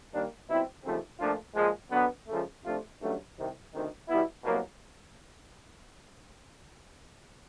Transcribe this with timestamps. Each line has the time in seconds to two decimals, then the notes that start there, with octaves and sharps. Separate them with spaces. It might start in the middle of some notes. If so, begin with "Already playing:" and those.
0.12 D#2 D#3 G3 A#3 D4
0.48 B2 G3 C4 E4
0.83 D#2 C#3 F3 A3 C4
1.19 A#2 F3 A3 D4 F4
1.55 A#2 F3 G#3
1.91 D3 F#3 B3
2.27 C#2 C#3 F3 A3
2.64 C3 F3 A3 D4 F4
3.00 G2 D#3 F#3 A3 C#4
3.35 C2 C3 D#3
3.72 D2 C3 D#3
4.08 B2 G3 B3 E4
4.44 C2 B2 F#3 A#3